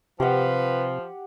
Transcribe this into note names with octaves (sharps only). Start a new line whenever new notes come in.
C3 F3 G4 B4 F#5